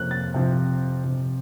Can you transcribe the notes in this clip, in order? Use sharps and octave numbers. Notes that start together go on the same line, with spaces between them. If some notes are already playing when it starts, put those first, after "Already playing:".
Already playing: F2 C3 F3 A#3 C#4 F#6
A6
C3 F3 C4
C3 F3 C4